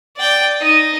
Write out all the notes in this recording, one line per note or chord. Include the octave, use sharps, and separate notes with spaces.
D5 G5
D#4 D#5